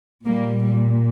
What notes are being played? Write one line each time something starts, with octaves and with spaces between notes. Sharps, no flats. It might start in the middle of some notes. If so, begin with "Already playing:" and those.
A#2 G3 A#3
G3